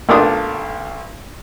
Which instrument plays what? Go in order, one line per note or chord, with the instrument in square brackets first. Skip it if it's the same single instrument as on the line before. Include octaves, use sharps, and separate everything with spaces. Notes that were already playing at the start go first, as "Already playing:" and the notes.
[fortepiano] B1 A3 A#3 D4 F4 D#6